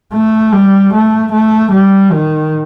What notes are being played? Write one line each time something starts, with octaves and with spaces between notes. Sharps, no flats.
A3
G3
A3
A3
G3
D#3